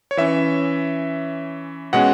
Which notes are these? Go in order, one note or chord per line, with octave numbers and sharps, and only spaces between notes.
C#5
E3 C#4 E5
B2 G#3 C#4 F#5